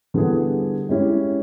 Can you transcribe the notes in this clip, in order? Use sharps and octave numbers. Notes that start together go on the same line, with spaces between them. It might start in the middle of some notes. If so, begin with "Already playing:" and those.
D3 G3 B3 E4 G#4
G#3 C#4 E4 G4